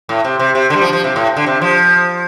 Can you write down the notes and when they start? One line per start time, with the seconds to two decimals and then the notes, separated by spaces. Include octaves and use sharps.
0.09 A2
0.24 C3
0.39 C3
0.55 C3
0.70 D3
0.76 G3
0.82 F3
0.93 F3
1.04 C3
1.16 A2
1.37 D3
1.46 C3
1.62 F3